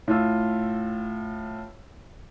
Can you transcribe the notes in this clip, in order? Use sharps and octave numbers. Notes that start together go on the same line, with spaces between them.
A2 F4 E6